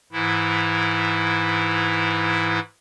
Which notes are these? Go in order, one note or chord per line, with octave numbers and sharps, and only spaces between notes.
G#2 E3 E4